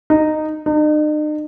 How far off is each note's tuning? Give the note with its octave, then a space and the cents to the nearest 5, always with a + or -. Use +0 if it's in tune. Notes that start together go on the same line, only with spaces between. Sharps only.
D#4 -15
D#4 -45